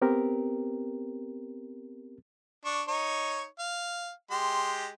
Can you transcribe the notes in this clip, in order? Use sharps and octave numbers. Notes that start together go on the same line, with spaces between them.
B3 C4 G4 A#4
D4 C#6
D#4 C#5 C#6
F5
G#3 G4 C6